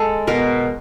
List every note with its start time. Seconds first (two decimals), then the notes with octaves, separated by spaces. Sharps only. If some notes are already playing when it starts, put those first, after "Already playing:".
Already playing: G#3 A4
0.27 B2 A#4